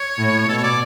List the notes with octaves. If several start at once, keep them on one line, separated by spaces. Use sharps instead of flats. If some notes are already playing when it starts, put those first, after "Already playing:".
Already playing: C#5
A2
B2 A4
C#5
D5